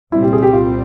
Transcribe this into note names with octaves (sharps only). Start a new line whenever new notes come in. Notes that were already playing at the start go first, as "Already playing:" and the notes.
C2 A#2 G3 C4 E4
G4
G#4
G4
F4